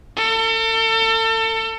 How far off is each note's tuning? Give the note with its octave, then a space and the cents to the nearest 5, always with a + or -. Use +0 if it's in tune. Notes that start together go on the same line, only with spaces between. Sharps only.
A4 +35